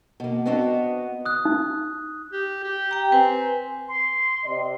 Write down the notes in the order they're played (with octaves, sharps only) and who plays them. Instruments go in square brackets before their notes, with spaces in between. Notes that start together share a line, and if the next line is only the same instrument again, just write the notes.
[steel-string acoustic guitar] B2 A#3
B3 C4 D4 F#4 D#5 F#5
[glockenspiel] D#6 F#6
[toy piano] D#4
[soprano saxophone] G4
G4
[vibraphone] G5 A#5
[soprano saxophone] C4 [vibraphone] B4 G#5
[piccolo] C6
[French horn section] C3 D5 D#5